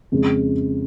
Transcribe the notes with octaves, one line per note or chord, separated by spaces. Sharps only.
F2 C#3 G#3